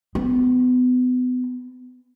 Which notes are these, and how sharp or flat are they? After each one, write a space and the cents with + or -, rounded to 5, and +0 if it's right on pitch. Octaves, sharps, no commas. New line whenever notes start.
B3 +30